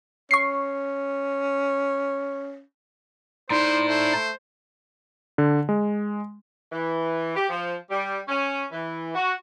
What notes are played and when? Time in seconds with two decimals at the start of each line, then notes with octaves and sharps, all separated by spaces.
0.31 C#4 C#6 C7
3.50 A2 D#4 E4 C5 D5 C6
3.88 A3 C5
5.38 D3
5.69 G#3
6.72 E3
7.36 G4
7.49 F3
7.90 G3
8.28 C#4
8.71 E3
9.15 F#4